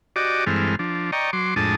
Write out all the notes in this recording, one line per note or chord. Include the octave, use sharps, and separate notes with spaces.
F#4 G4 D5 D#5 D6
G2 E3 G#3 C4 A4 F6
F3 D4
D5 D#5 G5 A#5 C#6
F#3 C6 D6
F2 A2 G#3 D4 A5 D#6